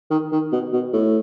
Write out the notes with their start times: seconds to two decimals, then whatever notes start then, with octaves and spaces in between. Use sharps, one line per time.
0.10 D#3
0.32 D#3
0.52 B2
0.73 B2
0.93 A2